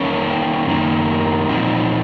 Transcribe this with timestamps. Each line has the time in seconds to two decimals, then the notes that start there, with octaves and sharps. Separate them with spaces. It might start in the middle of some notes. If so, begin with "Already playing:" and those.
Already playing: D#3 A#3 C#4
0.66 F#2 D#3 A#3
1.48 A#2 F3 C4 D#4